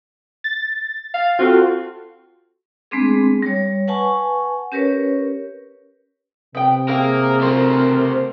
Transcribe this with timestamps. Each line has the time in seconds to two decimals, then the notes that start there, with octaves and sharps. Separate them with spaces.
0.44 A6
1.14 F5
1.39 C4 F4 F#4 A4
2.91 G#3 A3 B3 C4 D4 G#4
3.42 G3 C#5
3.88 B4 F#5 G#5 A5 C#6
4.72 C#4 G4 A#4 B4 C#5
6.55 C3 B3 G5
6.89 C4 G#4 A#4 F5
7.42 F#3 A3 F4 A#4 C5